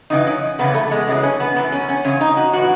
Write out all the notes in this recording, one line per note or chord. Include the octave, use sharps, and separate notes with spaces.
F#2 C#3 E3 D#4
C#4
E2 C#3 E3 B3
A3
G#3
F#2 C#3 E3
C#4
B3
F#2 E3 B3
C#4
C#4
E2 C#3 C#4
D#4
F#4
A2 E3 F#4